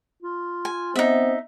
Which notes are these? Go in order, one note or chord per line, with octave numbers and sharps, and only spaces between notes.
F4
G#5
B3 C4 D#4 E5